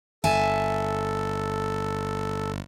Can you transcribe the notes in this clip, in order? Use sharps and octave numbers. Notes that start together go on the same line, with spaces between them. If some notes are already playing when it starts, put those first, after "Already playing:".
G1 A4 E5 G#5 A5